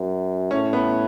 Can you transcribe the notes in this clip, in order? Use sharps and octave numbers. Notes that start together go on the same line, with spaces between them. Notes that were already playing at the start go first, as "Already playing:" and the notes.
Already playing: F#2
A2 C#4
B3